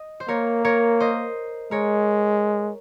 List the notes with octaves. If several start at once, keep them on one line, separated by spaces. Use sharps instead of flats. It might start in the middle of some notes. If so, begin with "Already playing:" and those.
Already playing: D#5
C5
A#3 A#4 C#5
A#4 C#5
C5 D#5
G#3 A#4 C#5